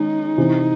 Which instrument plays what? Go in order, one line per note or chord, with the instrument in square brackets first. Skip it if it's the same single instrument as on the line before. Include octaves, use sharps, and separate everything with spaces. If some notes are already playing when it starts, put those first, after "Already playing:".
Already playing: [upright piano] D#3 G#3 C#4 [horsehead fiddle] D#4
[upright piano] C3 E3 C4